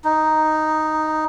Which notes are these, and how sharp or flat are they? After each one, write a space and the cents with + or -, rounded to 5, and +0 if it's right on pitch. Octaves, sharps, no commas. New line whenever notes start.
D#4 +0